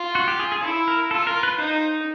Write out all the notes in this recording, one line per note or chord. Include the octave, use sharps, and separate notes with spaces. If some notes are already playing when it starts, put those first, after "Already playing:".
Already playing: F4
F#4
G4
G#4
G#4
E4 A4
A#4
F4 A4
A#4
B4
D#4 C5